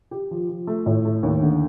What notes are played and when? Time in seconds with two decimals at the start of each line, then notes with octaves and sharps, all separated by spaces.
0.11 G4
0.31 F3
0.49 F3
0.67 A3
0.86 A2
1.05 A3
1.23 D#2
1.42 D3